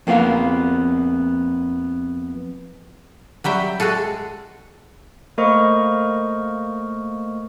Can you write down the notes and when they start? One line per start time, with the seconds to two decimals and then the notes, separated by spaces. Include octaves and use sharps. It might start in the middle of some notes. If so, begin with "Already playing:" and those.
0.07 F2 A#3 B3 G#4 F5
3.44 F#3 G3 E5 G5
3.80 G#3 F#4 G#4 A4
5.38 A3 A#3 A#4 C5 D#5 C#6